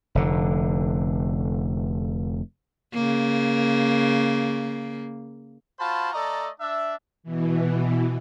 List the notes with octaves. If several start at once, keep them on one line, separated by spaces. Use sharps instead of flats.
F1 D3
C#3 A#3
F4 F#4 C5 A5 B5
A3 A4 D5 D#5 A#5
D4 E5
B2 E3